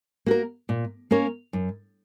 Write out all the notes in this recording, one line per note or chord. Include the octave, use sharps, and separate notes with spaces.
A#3 F#4 A#4
A#2
A#3 C#4 A#4 C#5
F#2